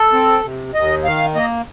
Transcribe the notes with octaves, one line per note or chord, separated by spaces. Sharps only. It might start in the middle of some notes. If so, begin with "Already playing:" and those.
Already playing: A4
C4
C3
D#2 D#5
D#3 F5
A#3 D#5